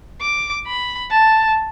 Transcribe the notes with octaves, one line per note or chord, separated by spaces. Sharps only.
D6
B5
A5